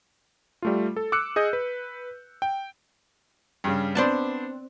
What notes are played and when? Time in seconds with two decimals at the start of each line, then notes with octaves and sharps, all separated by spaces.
0.62 G3 A3 F4
0.96 A4
1.12 D6 E6 F#6 C#7
1.36 G#4 D#5 G6
1.53 B4
2.42 G5
3.64 G2 C#3
3.95 B3 C4 D4 C5 D5 A5